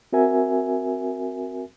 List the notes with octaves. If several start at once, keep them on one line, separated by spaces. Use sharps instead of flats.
C4 F#4 A#4 E5 G#5